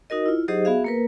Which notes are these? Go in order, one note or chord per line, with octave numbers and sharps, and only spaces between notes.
D#4 F#4 A#4 D#5
E4 F4
F#3 D#4 G4 G#4 C5 D#5
B3 F#4 G#4 E5 F5
A#3 A#4 B4